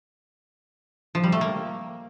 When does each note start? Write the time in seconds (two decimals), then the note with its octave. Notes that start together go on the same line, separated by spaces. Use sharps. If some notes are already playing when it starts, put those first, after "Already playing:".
1.15 F3
1.24 G3
1.32 A3
1.41 A#3